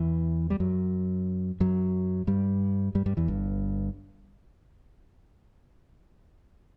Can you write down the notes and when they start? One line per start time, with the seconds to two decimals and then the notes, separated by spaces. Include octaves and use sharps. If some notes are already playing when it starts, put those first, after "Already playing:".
Already playing: E2 E3
0.50 G3
0.60 F#2 F#3
1.60 F#2 F#3
2.27 G2 G3
2.95 G2 G3
3.06 G2 G3
3.17 E2 E3
3.28 G1 G2